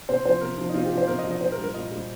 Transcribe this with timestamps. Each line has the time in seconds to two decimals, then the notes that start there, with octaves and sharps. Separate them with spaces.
0.09 C3 C5
0.25 F3 C5
0.41 C3 A#4
0.58 F3
0.69 D#4
0.74 C3 F4
0.85 G4
0.92 F3
0.98 C5
1.08 C3 A#4
1.18 D#5
1.25 F3
1.31 D#5
1.41 A#2 C5
1.52 A#4
1.58 G3
1.64 A#4
1.74 A#2 D#5
1.91 G3